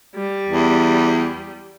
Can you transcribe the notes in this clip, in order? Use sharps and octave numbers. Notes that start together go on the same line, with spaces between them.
G3
E2